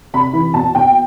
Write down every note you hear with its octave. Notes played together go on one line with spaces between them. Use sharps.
C3 B5
E3
B2 A5
B2 G5